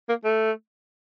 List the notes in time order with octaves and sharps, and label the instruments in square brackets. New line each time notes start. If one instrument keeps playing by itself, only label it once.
[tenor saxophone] A#3
A3